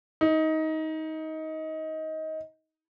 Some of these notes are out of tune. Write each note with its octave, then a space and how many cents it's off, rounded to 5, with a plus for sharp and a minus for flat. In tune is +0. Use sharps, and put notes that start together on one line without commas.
D#4 +20